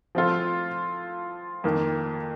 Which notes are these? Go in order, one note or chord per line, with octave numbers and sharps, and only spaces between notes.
F3 C4 F4 A4
F2 D#3 A#3